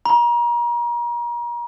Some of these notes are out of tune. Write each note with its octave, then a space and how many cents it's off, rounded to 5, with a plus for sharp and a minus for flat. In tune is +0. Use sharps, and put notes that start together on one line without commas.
A#5 +35